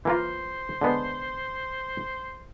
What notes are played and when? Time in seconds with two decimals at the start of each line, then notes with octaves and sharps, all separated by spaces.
0.05 E3 A#3 F4 C5
0.81 D3 G#3 B3